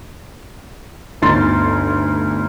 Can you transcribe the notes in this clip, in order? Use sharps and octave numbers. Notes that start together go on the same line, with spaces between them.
G1 D2 D#4 C6 A6